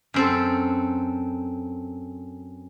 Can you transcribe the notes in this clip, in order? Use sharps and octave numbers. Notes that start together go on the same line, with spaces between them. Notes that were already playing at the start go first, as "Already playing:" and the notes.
F#2 C4 A4